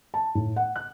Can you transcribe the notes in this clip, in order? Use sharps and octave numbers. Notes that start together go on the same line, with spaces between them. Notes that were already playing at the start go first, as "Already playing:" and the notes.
A5
A2
F#5
F#6